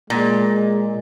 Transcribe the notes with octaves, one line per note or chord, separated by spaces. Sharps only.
A#2 G#3